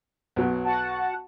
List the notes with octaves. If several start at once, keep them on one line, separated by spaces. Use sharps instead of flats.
B1 F#3
F#4 F#5 A5